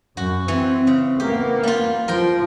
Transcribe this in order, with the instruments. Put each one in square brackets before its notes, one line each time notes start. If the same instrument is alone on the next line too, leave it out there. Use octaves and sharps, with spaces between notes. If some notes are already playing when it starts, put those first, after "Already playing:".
[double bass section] F#2 [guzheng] F#4
[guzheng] E3 [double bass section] C4
[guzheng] C#3
[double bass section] A#3 B3 [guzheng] G4
[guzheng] G3 F4
[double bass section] F3 [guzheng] A#4 G5